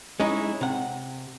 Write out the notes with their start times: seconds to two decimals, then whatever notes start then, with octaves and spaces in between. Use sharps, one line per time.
0.20 G#3 C#4 D#4 E4
0.61 C3 F#5